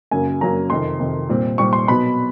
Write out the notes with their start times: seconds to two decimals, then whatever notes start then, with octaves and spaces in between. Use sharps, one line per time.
0.11 F#2 C#3 F#3 A#3 G#5
0.41 F#2 C#3 F#3 A#3 A#5
0.70 F2 C3 D#3 C6
1.00 F2 C3 D#3
1.29 A#2 G3 C4
1.58 A#2 G3 C4 C#6
1.73 C6
1.87 B2 F#3 B3 B5